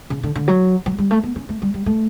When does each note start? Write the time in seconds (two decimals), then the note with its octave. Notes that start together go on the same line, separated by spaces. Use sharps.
0.10 C#3
0.23 D3
0.35 D3
0.48 F#3
0.86 F#3
0.98 G3
1.11 A3
1.23 B3
1.36 C#4
1.49 A3
1.62 G3
1.74 G3
1.86 A3